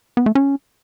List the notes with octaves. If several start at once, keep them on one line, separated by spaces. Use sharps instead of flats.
B3
A3
C#4